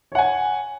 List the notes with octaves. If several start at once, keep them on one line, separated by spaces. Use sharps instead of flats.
C#5 F#5 G#5